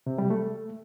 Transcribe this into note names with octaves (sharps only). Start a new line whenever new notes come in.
C3
G3
A3